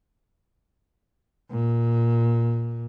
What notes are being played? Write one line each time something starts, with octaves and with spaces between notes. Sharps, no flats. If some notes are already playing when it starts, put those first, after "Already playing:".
A#2